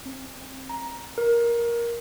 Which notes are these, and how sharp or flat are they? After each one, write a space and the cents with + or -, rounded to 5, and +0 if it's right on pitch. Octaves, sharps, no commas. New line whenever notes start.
C4 +20
A#5 +15
A#4 +10